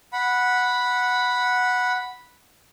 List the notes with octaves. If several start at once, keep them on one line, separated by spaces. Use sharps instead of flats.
F#5 B5